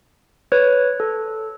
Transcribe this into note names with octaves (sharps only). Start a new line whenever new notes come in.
B4 C#5
A4